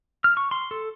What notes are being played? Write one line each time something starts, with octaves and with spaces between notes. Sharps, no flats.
F6
C#6
C6
A4